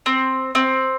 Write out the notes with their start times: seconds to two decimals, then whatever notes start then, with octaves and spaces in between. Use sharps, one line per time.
0.06 C4
0.55 C4